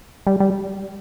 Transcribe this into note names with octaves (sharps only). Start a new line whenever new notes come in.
G3
G3